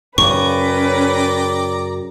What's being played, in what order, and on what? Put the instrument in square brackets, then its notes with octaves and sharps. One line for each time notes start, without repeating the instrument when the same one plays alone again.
[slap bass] F#2 C#3 [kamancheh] C#4 B4 [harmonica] D5 G5 A#5 [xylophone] C#6